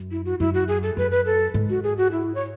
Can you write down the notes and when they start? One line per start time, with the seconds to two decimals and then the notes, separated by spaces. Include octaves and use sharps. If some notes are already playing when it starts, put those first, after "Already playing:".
Already playing: F#2
0.11 E4
0.25 F#4
0.40 F#2 E4
0.54 F#4
0.68 G#4
0.83 A4
0.97 F#2 B4
1.11 B4
1.26 A4
1.54 G#2
1.69 F#4
1.83 G#4
1.98 F#4
2.12 E4
2.35 C#5